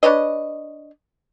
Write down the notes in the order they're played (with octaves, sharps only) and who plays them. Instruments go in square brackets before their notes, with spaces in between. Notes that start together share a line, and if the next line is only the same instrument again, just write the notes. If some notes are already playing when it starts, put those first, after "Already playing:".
[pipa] D4 B4 C#5 D#5